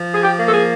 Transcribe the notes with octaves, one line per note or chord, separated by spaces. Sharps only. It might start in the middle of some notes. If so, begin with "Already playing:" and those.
Already playing: F3
G#4
G4
A#3
A4
G#4